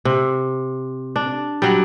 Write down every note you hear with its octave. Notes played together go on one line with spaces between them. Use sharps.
C3
D4
F#3 G3